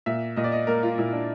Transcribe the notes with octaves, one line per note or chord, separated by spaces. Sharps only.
A#2 E5
A#2 D#5
D5
D#5
A#3 A#4
F4
A#2 E4
D4